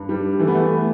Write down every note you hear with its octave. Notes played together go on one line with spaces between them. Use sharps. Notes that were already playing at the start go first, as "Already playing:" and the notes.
Already playing: G2
G3
E3 A3
B3
A3